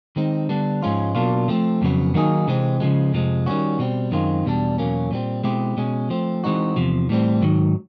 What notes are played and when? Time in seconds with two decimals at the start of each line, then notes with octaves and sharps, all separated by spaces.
0.16 D#3 G#3 C4 D#4
0.49 D3 G3 B3 D4
0.82 G#2 F3 G#3 C#4 F4
1.15 B2 F#3 A#3 D4 F4
1.48 F3 A3 C4
1.82 F2 C#3 F#3 B3
2.14 D#3 F#3 A#3 D#4 G#4
2.48 C3 E3 G#3 C4
2.80 C#3 F3 G#3
3.13 F2 C3 F3 G#3
3.46 D#3 G3 A#3 C#4 F#4
3.79 B2 G3 C4
4.12 F#2 D#3 G#3 C4 F4
4.45 E2 B2 G3 B3 D4
4.78 E2 B2 F#3 A#3 C#4
5.11 A#2 G3 C4
5.44 B2 G#3 C4 E4 G4
5.77 B2 G#3 C#4
6.10 F3 A3 C4
6.44 E3 G#3 C4 D#4 F#4
6.76 E2 C3 F3
7.09 A2 E3 G3 C4
7.42 G#2 D#3 F#3